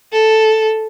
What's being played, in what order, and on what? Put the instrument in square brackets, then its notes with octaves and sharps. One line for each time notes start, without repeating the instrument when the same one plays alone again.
[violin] A4